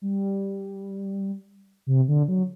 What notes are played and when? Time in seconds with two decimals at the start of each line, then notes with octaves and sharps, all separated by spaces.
0.02 G3
1.87 C3
2.08 D3
2.28 F#3